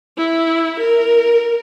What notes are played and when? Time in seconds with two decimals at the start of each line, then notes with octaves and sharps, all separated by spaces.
0.18 E4
0.79 A#4